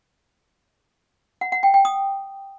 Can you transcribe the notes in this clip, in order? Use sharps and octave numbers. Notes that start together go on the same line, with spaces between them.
F#5
F#5
G5
G5
D#6